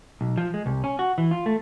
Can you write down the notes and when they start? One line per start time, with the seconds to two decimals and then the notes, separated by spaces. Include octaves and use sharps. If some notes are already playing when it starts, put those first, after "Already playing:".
0.21 B1
0.38 F3
0.54 G#3
0.66 C2
0.84 C#4
0.99 F#4
1.18 E3
1.31 F4
1.46 A3